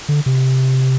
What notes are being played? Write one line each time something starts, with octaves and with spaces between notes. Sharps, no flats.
D3
C3